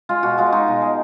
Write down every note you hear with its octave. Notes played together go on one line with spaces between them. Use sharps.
G#3 F4
B2 F#4
G#3 F4
G#3 D#4
B2
G#3